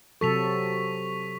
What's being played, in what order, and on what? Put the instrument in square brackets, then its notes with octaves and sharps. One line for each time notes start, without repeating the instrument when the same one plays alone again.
[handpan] C3 F#3 A4 [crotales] C#6 B6 F7